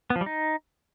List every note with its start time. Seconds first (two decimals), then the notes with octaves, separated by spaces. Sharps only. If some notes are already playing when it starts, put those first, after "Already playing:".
0.10 B3
0.16 F3
0.21 G3
0.26 D#4